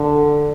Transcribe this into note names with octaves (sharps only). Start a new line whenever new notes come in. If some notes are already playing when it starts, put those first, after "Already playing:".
Already playing: D3